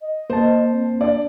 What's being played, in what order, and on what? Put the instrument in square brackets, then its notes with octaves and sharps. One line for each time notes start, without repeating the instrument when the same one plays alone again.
[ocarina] D#5
[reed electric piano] A#3 A5 [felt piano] C5
[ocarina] C4
[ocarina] D4 [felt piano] D5